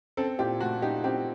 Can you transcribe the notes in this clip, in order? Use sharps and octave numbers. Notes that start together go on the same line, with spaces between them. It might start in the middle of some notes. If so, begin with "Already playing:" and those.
C4 A4
A#2 G4
A3 F#4
D#4 G4
C4 G4